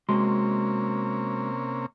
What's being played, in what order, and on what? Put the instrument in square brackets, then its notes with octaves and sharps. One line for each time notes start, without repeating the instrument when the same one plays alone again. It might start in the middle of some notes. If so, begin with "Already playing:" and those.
[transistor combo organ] C3 A#3 C#4 [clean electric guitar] G#3 F#4 C6